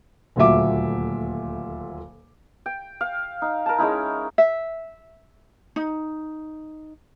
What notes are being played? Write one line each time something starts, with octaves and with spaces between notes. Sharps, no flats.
D#1 D2 A#2 F#3 E5 D6
G5
F5
D#4
A#4 A5
G#3 C#4 D#4 E4
E5
D#4